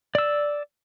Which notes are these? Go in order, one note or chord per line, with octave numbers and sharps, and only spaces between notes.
D5 E6